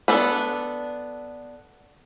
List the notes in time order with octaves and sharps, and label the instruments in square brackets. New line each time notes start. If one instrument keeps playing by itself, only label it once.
[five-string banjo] B3 D4 A4